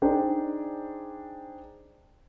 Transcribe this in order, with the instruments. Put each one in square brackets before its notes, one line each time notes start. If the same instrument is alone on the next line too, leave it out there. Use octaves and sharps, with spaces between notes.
[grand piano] D4 D#4 G#4 C5 D5 G5